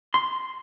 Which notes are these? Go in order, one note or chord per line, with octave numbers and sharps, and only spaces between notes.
C6